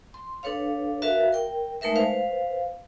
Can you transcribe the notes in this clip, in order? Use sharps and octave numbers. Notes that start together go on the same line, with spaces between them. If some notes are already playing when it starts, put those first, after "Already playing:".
C6
D4 A4 B4 C#5 F5
F#4 A#4 B4 E5 F5
A#4 G5
G#3 A3 D#4 A#4 B4 E5
B4 C5 F5